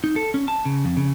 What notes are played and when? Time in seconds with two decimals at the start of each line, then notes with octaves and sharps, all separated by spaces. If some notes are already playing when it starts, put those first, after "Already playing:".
0.04 D#4
0.16 A4
0.34 C#4
0.48 A5
0.65 C#3
0.85 F2
0.97 C#3